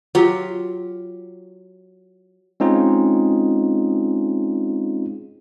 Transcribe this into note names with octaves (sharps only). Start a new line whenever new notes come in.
F#3 F4 G4
G#3 C4 C#4 D#4 F4 G#4